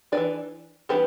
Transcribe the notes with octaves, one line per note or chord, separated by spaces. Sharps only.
B3 D4 B4 D5
E3
E3 G3 B3 D4 G4 B4